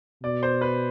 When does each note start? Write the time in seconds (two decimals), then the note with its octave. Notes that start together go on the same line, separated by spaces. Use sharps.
0.23 B2 D5
0.43 C5
0.61 B4